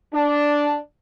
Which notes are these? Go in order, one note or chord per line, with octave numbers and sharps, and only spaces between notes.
D4